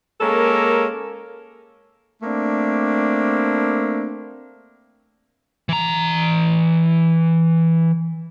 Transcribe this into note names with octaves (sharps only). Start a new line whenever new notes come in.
G#3 A#3 C#4 A4 A#4
A3 A#3 C4 D4
E3 A#5